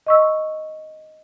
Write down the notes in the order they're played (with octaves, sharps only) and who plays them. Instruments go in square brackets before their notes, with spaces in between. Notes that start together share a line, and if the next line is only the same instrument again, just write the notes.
[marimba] D#5 C#6 E6